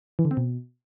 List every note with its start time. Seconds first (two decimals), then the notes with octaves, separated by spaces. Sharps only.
0.19 E3
0.25 D3
0.31 C4
0.37 B2